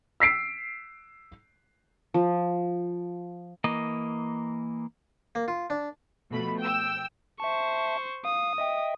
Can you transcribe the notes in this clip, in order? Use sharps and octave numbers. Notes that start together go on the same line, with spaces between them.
E6 B6 C7 D7
F3
E3 A#3 D#5
A#3
F4
D4
B2 F3 A3 B5
G5 E6
C5 E5 A5 C#6
F5 D#6
D#5 E5 G5